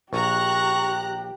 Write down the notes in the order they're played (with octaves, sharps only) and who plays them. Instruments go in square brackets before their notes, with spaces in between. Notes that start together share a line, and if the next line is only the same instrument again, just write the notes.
[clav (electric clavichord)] A#1 [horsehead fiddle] G4 [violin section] A#5 F#6 [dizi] C#6